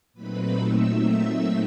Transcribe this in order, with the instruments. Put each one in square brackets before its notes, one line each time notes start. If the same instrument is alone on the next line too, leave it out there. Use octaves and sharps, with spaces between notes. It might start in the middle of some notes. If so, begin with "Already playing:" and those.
[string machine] A#2 F#3 A3 C4 D#4 B4 B5
E5 E6
E5 E6